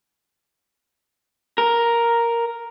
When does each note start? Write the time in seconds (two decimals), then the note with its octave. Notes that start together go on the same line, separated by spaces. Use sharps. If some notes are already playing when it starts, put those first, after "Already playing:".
1.58 A#4